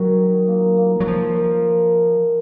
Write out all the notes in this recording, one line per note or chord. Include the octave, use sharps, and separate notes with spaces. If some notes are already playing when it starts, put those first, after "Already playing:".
Already playing: D#3 F#3 A#4
D#4
A#3
A#3
F#3
F3 C#5
A#4